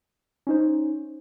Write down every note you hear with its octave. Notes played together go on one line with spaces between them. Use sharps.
C#4 D#4 C5